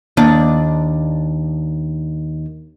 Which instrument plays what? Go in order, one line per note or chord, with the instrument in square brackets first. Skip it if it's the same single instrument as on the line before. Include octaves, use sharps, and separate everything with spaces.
[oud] D#2 D4